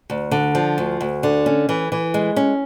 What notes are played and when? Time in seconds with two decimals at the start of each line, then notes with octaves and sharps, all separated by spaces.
0.10 D2
0.31 D3
0.55 F3
0.78 D2
1.01 D2
1.23 D3
1.46 C#4
1.69 E3
1.92 E3
2.14 G#3
2.36 C#4